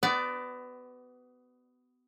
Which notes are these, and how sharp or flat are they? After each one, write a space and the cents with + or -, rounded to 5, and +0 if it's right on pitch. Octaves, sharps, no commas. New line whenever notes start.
B3 +20 F#4 +40 D5 +0